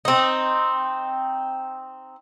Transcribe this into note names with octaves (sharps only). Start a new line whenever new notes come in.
C4 D#4